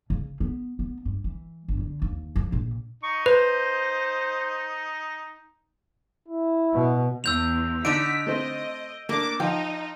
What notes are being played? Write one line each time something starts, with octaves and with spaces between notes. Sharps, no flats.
C#3
B3
B3
G2
E3
G1
D3
D#2
F3
A#1
D#4 C#6
B4 C5
E4
B2
E2 E6 G6 F7
D3 D4 D#4 B6 D7
A3 C4 D#5
A3 A#3 D4 D6
F3 D#4 G5